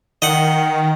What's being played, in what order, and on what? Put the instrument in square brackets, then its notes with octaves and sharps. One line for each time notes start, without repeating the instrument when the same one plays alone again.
[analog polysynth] D#3 [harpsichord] D#5 F#5